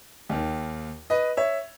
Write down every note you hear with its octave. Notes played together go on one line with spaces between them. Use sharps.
D#2 D#3
B4 D#5
C#5 E5